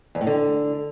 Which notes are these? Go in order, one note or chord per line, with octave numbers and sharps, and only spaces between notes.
E2
A2
D3